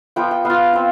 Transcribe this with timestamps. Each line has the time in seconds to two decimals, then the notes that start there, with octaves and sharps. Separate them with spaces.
0.16 F3 B3 F4 G5
0.31 G5
0.45 B3 F4 F5
0.73 C4 F4